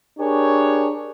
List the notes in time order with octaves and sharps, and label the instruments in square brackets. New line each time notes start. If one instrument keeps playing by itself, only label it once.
[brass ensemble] D4 G4 G#4 A#4 C#5